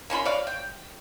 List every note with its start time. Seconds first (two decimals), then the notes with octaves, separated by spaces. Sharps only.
0.10 A#3 C#4 F4 B5
0.25 C#5 D5 F5
0.47 G5